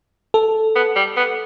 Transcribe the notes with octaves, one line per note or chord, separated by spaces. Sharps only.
A4
B3
G3
B3